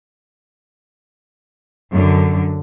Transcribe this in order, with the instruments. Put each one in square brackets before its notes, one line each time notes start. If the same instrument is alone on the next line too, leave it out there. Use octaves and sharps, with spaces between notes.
[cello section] F#2 D3